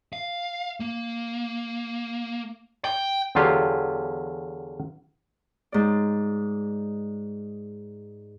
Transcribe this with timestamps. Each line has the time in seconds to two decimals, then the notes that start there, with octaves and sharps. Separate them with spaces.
0.13 F5
0.80 A#3
2.85 G5
3.35 E2 D3 F#3 F4 G4
5.72 G#2 D5